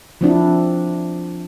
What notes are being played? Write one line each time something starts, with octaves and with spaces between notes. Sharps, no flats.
F3 C4 D4 E4